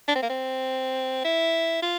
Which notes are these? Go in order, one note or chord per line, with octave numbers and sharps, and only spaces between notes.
D4
C4
A#3
C4
E4
F4